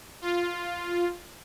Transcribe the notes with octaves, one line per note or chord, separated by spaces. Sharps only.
F4